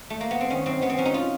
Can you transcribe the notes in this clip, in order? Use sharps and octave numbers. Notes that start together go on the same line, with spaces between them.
A3
A#3
B3
C4
D#3 C#4
F#2 C4
D#3 B3
C4
F#2 C#4
D#4
F4